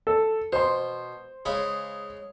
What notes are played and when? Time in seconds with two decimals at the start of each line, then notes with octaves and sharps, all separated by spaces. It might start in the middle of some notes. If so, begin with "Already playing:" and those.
0.07 A4
0.53 B2 C5 C6
1.46 C#3 G#3 B5